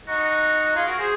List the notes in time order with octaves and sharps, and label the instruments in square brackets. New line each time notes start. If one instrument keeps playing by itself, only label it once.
[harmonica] D#4 [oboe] F#4
[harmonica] F4 [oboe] G#4
[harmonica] F#4 [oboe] A#4
[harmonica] G#4 [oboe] C5